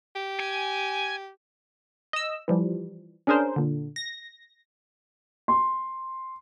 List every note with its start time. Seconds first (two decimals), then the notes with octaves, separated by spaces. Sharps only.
0.15 G4
0.40 G#5
2.13 D#5 E6
2.48 E3 F3 G3
3.27 C#4 D4 G#4 A#4 C5
3.56 A#2 D3
3.96 A#6
5.48 C6